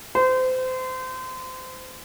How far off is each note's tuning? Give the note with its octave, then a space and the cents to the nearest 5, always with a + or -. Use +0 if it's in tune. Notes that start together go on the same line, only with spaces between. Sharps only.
C5 -30